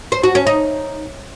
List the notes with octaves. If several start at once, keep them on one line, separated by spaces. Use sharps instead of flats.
C5
F#4
C#4
D#4